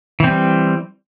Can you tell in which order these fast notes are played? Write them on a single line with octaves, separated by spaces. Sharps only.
E3 C4 G3